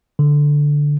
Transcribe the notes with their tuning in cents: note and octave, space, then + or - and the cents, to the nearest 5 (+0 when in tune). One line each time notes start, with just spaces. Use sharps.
D3 -5